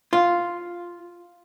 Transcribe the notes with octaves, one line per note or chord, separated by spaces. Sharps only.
F4